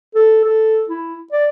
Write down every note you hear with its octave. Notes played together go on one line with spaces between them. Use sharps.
A4
A4
E4
D5